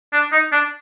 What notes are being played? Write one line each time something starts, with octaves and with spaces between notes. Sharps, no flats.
D4
D#4
D4